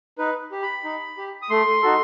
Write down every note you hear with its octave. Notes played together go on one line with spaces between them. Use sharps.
D#4 B4
G4
B5
D#4
G4
D#6
A3 C6
D#4 F#4 A4